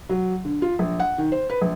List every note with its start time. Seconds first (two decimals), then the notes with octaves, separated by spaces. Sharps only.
0.09 F#3
0.45 D3
0.62 F4
0.79 A#1
1.00 F#5
1.18 D#3
1.32 C5
1.50 B4
1.61 A#1